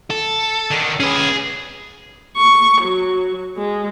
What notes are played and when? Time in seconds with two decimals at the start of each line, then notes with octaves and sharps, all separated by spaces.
0.10 A4
0.71 D3 D#3
1.00 C#4 G#4 B4
2.37 C#6
2.81 F#3
3.57 G#3